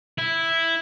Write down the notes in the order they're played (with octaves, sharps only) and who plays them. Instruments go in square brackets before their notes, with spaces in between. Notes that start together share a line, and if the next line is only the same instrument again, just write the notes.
[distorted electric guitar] E4